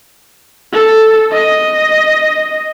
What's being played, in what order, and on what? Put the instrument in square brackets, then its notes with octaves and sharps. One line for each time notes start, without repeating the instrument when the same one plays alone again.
[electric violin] A4
D#5